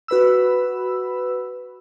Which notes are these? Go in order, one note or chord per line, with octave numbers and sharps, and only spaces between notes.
F#4 B4 B5 E6